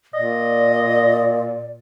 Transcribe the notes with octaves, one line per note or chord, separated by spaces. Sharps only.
A#2 D5 D#5